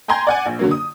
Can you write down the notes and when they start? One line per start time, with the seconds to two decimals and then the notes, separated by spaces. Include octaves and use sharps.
0.08 G5 G#5 A#5 C6 G6 G#6
0.27 D5 F#5 G#5
0.46 A#1
0.59 D3 F#3 A#3
0.71 D#6